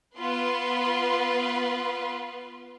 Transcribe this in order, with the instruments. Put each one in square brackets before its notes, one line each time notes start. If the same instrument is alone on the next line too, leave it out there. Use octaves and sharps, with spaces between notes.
[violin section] B3 F4 B4 C6